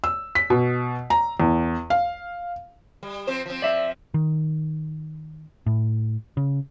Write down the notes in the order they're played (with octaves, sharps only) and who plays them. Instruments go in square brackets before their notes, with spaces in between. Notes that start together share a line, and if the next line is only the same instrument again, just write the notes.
[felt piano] E6
B6
B2
A#5
E2
F5
[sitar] G3
F3 C4 C5
F3 C4
[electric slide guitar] D5 E5
[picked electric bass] D#3
A2
C#3